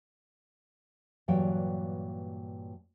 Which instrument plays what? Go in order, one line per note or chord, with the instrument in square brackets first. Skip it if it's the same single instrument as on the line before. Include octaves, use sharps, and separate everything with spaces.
[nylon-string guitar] G2 A#2 E3 F#3 F#5 G5